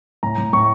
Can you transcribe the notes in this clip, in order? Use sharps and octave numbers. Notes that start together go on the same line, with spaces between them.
A2 A#5
A2
A2 C#6